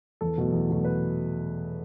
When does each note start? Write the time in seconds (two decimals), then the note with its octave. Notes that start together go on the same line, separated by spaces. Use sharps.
0.21 E2 A4
0.38 B2 F#3 A3
0.52 E2
0.68 B2 F#3 A3
0.85 B4